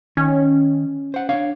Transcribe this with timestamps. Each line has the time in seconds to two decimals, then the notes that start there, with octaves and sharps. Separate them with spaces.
0.17 D#3 C#4
1.14 C5 F#5
1.29 D4 C#5 F5